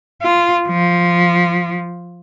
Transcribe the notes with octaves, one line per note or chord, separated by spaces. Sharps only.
F4
F3